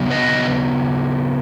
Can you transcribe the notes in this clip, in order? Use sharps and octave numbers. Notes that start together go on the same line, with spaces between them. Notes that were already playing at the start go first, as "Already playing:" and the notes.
Already playing: C#3 F#3 B3
B4 D#5